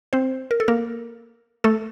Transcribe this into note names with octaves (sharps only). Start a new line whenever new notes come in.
C4 C5
A#4
A4
A#3 A#4
A3 A4